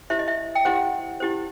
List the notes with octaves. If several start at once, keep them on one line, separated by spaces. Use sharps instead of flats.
E4 G4 C5 E5
D#5
E5
G5
E4 G4 C5 F#5
E4 G4 C5